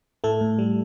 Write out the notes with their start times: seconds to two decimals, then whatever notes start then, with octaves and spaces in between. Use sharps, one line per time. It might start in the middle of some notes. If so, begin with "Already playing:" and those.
0.24 A2 A3 A4
0.41 A2
0.59 G3